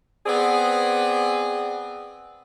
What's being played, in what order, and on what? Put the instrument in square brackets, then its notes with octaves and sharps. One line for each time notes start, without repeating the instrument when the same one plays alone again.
[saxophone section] B3 C4 G#4 D5